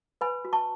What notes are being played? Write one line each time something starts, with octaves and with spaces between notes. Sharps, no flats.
B4 G#5 B5
F#4
A5 C#6